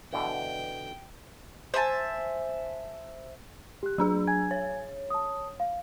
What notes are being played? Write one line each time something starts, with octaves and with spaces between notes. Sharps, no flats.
B2 D3 E3 G5
C5 E5 G#5 A5
G4 F#6
F#3 D4 G#4 E6
G#5 G#6
C#5
A5 D#6
F5